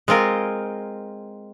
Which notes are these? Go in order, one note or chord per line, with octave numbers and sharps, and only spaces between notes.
G#3 C4 F4 A#4